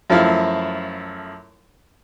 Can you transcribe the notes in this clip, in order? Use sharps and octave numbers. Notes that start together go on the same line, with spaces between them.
F#2 F3 A3 E4 F5